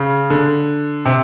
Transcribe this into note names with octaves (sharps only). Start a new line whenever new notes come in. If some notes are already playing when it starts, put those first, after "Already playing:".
Already playing: C#3
D3
C3